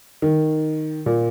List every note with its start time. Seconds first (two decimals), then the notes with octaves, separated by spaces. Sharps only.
0.22 D#3
1.06 A#2